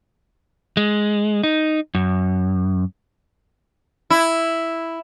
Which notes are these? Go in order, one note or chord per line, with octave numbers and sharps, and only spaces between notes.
G#3
D#4
F#2
E4